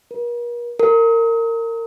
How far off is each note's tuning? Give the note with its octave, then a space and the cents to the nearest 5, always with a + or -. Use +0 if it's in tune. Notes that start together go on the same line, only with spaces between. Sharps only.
A#4 +45
A#4 -25